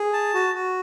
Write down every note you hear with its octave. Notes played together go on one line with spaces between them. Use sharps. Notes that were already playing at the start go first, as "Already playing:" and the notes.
Already playing: G#4
A5
F#4
F#4